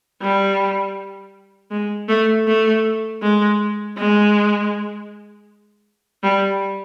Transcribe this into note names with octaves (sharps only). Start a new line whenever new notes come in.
G3
G#3
A3
A3
G#3
G#3
G3